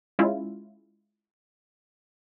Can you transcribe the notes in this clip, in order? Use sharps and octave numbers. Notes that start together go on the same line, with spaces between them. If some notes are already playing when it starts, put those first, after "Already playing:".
G#3 C#4 E4 F4